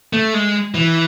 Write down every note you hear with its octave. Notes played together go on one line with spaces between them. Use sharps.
A3
G#3
E3